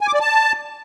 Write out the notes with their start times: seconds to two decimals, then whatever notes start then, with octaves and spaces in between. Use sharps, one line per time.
0.01 G#5
0.07 D6
0.14 D5
0.21 A5